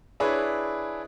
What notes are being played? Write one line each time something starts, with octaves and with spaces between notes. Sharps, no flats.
D4 E4 G#4 B4 C#5